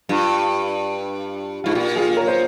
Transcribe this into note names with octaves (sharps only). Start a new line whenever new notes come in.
G2 F4
G#2 F4
A#2 G4
F4 G#4
A#4 C#5
C5